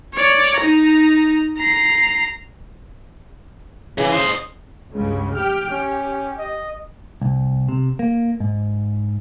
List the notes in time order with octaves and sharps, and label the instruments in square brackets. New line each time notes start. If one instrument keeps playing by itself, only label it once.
[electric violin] C#5 D5
D#4 A#5
A#5 C7
[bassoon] C#3 [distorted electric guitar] E3
[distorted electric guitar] C5 D#5
[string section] C#2 G2 C#3
G4 G5 F6
[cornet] C#4 [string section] G4
[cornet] D#5
[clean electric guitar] C2
C3
A#3
G#2